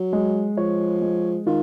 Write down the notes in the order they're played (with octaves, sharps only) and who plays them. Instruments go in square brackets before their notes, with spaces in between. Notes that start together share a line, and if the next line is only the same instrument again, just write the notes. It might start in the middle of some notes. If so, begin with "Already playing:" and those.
Already playing: [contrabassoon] F#3
[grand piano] G#3
[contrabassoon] F3 [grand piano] C#5
[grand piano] G#3
[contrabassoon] D#3 [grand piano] F4